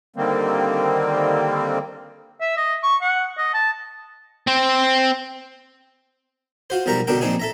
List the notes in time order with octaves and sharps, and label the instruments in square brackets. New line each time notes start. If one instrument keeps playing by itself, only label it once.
[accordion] D3 D#3 G3 A#3 C4
[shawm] E5
D#5
C#6
F#5
D#5
A5
[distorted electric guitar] C4 C5
[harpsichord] F4 F#4 C5
B1 F3 G3 A#4 A#5 C#6
C#2 B2 D3 D4 A#4 G5
A#1 C4 D4 D#4 G#4
A4 E5 A#5